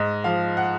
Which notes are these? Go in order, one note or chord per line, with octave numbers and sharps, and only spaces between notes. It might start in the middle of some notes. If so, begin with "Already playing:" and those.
Already playing: G#2 D#5
F3 F5
F#5